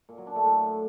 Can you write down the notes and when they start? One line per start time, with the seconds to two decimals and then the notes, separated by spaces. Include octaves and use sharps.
0.09 A#2
0.18 F#3
0.27 D4
0.36 A3
0.45 A2